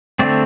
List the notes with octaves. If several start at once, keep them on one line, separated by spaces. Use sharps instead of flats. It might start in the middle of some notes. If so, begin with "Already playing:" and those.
D3 A3 C4 D5